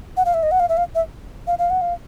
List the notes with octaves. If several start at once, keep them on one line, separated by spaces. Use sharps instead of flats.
F#5
F5
E5
D#5
F#5
F5
E5
F5
E5
F5
F5
F#5
F5